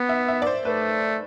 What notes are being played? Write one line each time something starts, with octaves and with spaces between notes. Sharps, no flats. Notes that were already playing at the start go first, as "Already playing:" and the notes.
Already playing: B3
E5
E5
D5
C5
A3 B4